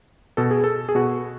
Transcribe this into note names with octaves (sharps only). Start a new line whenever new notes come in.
B2 A4
G#4
A4
G#4
B2 F#4